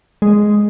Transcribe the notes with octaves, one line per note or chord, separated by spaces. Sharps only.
G#3